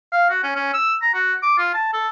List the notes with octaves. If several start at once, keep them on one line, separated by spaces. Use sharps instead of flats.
F5
F#4
C#4
C#4
E6
A#5
F#4
D6
F4
A5
A4